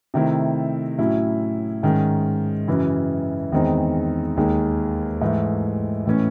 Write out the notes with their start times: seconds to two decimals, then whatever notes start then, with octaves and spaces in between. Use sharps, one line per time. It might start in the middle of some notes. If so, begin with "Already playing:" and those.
0.14 C3 D#3 A3 C4 E4
0.98 A2 F#3 C#4 E4
1.83 G#2 D#3 G#3 C#4
2.67 F#2 C#3 E3
3.52 E2 D#3 G#3 C4 D#4
4.37 D#2 D#3 G#3 D#4
5.21 G#2 E3 A3
6.06 A2 E3 A3 C#4